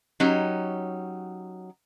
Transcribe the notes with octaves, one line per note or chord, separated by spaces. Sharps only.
F#3 C#4 D#4 G4